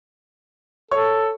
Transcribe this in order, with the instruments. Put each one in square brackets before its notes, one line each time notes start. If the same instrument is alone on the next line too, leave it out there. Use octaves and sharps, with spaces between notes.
[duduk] A4 [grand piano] C#5 C#6